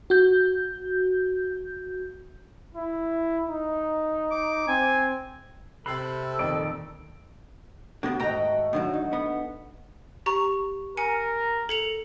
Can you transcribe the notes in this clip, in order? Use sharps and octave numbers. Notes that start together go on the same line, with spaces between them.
F#4 G6
E4
D#4
D6
C4 G#5
C3 A4 B5 F#6 C7 F#7
F2 A#2 D#3 D5
D3 A#3 B3 F#4 G4
D#2 G#2 A3 D#5 F#5 G5 A#5
A2 D3 D#3 F#3
D#4
B3
G4 A#5 C#6
A#4 G#5 C#7
A4 C#7 F7